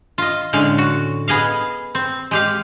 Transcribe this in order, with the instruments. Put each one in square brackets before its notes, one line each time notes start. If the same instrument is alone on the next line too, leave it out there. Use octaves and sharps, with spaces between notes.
[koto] F4 D#5
A2 D3 G#3 C#4 F5
F#4
B3 G#4 D#5 F5
C4
G#3 G4 F5